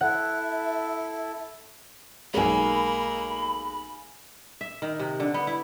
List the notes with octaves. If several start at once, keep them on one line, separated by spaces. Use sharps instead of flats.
E4 A4 E5 F#5
B1 G#3 A#3 F5 G#5 B5
E5
D#3
C3
D3
B3
E4